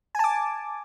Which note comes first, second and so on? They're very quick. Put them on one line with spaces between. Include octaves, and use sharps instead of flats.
G#5 A5 D6